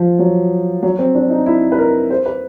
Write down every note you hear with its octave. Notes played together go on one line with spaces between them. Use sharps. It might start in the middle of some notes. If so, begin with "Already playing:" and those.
Already playing: F3
F#3
F#3
C4
D4
D#4
E4
B4
A#4
C5
B4